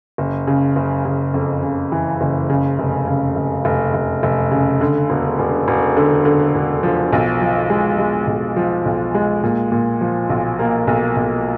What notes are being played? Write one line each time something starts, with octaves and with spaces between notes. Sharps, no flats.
F#1
C#3
F#1
C#3
F2
C#3
E3
F#1
C#3
F1
C#3
F1
F1
F1
F1
C#3
D3
E1
E1
E1
D3
D3
E1
F3
B1
F3
G#3
G#3
B1
F3
B1
G#3
A#2
A#2
F3
B1
A#3
B1
B1